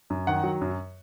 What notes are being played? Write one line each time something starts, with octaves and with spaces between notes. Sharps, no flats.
F#2
D#3 F#5
F#3
F#2